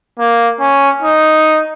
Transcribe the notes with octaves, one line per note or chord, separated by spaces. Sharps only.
A#3
C#4
D#4